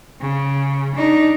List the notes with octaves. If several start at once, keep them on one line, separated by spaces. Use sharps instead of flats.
C#3
D4 D#4